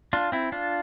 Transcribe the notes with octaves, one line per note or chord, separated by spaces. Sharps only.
D4 F4
C4 E4
D4 F4